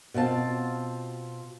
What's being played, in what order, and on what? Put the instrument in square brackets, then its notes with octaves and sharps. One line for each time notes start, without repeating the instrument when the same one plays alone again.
[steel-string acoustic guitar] B2 C4 F4 A5